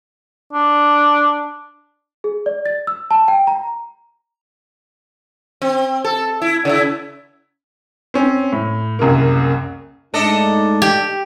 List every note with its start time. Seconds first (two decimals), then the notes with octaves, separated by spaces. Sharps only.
0.53 D4
2.24 G#4
2.46 D5
2.66 A6
2.87 E6
3.11 A5
3.28 G5
3.47 A#5
5.62 C4
6.04 A4
6.42 E4
6.65 C#3 E4
8.14 C4 C#4
8.52 A2
8.99 C2 F#2 C#3 A#3
10.14 G#2 A3 D4 D#4 A4 D#5
10.82 G4